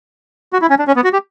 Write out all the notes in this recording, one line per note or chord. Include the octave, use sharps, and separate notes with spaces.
F#4
E4
C#4
D4
C#4
B3
F#4
G4